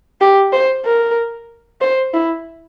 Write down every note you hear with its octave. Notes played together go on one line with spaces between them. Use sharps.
G4
C5
A#4
C5
E4